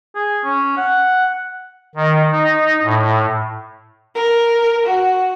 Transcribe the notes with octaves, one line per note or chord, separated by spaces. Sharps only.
G#4
C#4
F#5
D#3
D#4
A2
A#4
F#4